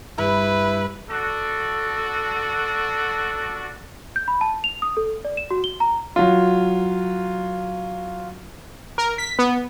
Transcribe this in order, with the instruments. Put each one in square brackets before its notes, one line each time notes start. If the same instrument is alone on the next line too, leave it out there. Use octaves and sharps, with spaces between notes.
[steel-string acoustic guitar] G2 [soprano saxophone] E4 [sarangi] B4
[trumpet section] D4 F#4 [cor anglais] A4
[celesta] G6
B5
A5
F7
D#6
A4
D5
E7
F#4
G7
A#5
[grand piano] F#3 F4
[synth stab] A#4
B6
B3